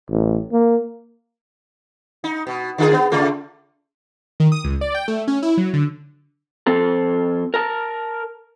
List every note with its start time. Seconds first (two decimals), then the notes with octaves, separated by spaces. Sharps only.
0.10 A1
0.52 A#3
2.24 D#4
2.47 B2
2.78 D3 F4 G#4
2.93 B3
3.11 C#3 A3 F4
4.40 D#3
4.52 D#6
4.64 C#2
4.81 D5
4.94 G5
5.08 A3
5.28 C#4
5.42 E4
5.57 F#3
5.73 D3
6.67 F2 C4 A4
7.54 A#4 A5